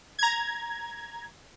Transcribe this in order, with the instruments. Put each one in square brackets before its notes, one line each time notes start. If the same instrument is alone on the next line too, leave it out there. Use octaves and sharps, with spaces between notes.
[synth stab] A#5 G#6